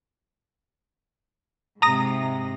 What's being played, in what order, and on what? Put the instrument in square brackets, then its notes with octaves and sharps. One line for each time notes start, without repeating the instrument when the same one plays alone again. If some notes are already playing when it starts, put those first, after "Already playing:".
[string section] G#2 C3 [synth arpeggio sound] A#5 D#6 A#6